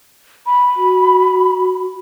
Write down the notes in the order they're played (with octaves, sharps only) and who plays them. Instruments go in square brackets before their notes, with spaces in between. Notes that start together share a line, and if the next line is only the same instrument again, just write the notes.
[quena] B5
[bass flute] F#4